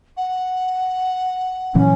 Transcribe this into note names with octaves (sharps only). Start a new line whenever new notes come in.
F#5
A#2 E3 F#3 C#4